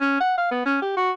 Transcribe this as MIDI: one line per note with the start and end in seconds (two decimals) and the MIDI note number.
0.01 0.16 61
0.20 0.34 78
0.38 0.50 77
0.51 0.64 59
0.66 0.77 61
0.82 0.95 67
0.97 1.11 66